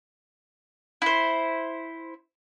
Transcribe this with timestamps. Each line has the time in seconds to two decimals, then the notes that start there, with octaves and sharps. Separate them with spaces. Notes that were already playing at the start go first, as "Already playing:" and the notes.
1.02 E4 C5